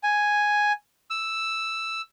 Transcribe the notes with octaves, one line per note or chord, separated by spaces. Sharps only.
G#5
E6